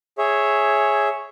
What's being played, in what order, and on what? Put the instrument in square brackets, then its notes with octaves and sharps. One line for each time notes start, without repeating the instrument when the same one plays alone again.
[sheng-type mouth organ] G#4 C#5 E5